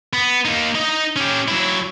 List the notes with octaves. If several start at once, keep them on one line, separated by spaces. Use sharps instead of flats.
B3
A#3 D#4
D#4 D#5
C#4 G4
F#3 E4